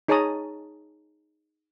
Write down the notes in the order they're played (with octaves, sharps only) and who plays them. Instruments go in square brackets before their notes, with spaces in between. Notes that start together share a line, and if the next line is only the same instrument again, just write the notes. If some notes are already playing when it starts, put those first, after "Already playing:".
[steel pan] D#4 G#4 C#5 A5 A#5 D#6